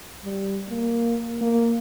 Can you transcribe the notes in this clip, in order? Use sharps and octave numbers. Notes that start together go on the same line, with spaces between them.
G3
A#3
A#3